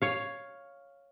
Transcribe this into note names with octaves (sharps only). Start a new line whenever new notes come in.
C#5 F5